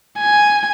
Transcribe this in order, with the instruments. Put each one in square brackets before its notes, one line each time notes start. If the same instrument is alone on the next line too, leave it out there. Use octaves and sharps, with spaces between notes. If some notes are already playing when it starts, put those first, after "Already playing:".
[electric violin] G#5